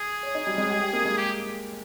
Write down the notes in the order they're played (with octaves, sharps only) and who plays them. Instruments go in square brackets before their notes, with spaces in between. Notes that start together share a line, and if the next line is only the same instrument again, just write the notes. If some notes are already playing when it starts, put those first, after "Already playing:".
Already playing: [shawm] G#4
[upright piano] C#5
D#4
G3
G#3
G4
G4
A#3
G#3
[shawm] G4